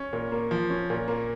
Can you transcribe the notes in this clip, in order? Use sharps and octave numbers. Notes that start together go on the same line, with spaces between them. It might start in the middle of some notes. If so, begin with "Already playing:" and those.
Already playing: C#4
A#2
A#3
F3
C#4
A#2
A#3